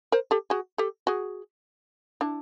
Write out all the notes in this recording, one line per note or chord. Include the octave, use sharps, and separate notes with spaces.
A#4 C5
G4 A4
F#4 G#4
G4 A4
F#4 G#4
D4 E4